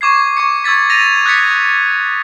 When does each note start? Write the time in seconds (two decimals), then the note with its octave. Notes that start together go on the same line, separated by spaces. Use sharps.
0.01 C#6 D6 G#6 C7
0.37 C#6 G#6 C#7
0.64 C#6 E6 G#6 A6 B6
0.90 A#6 D#7 F7
1.25 D#6 F#6 G#6 A6 B6 C#7